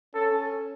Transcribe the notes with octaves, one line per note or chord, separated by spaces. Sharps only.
C#4 A4